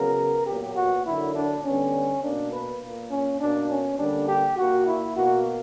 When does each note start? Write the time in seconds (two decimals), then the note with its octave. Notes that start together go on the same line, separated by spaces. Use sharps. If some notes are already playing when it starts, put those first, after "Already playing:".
Already playing: C#3 F#3 B3 A#4
0.47 A#2 F#3 B3 G4
0.76 F#4
1.05 D3 F#3 A#3 E4
1.35 D4
1.64 D3 G3 B3 C#4
2.23 B2 A#3 D4
2.52 B4
2.81 A#2 A#3
3.11 C#4
3.40 B2 A#3 D4
3.70 C#4
3.99 D3 G3 A#3 D4
4.28 G4
4.58 A#2 A#3 F#4
4.87 E4
5.16 B2 A#3 F#4